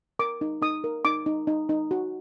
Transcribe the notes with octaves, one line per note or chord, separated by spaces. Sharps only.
A#4 D6
D#4
D#4 D#6
A#4
D#4 D6
D#4
D#4
D#4
F#4